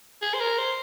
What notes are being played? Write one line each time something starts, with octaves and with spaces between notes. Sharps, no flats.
G#4
C5
A#4
C5